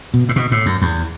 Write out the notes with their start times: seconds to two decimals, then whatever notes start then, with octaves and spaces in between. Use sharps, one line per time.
0.14 B2
0.29 A2
0.36 B2
0.52 A2
0.66 F#2
0.82 E2